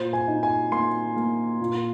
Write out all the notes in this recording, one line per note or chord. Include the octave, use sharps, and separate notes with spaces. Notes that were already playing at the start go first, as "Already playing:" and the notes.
Already playing: A#2 C5
G#5
D#4
G#5
A#3 C6
A#3
A#2